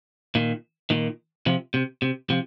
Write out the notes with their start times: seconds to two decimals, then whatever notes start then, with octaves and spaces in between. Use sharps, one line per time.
0.35 A#2 D#3
0.90 A#2 D#3
1.46 C3 F3
1.74 C3
2.02 C3
2.30 C3 F3